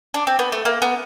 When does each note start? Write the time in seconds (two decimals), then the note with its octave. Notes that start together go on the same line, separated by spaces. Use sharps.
0.14 D4
0.27 C4
0.39 B3
0.52 A3
0.65 A#3
0.82 B3